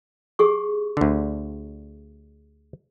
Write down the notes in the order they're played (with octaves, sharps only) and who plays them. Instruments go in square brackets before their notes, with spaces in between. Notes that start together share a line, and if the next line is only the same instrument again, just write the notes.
[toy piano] G4 G#4 C#6
[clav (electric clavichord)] D2 D3